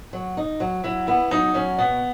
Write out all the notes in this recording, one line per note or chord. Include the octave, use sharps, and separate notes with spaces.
F#3
D#4
F#3
F#3 E4
B3 E4
F#3 D#4
F#3 C#4
B2 B3